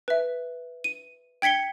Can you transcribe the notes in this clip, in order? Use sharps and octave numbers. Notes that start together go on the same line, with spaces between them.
B4 E5
D#7
G5 G#6 B6 C#7 G7